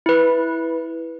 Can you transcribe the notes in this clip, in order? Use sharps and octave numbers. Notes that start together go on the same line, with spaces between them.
E4 B4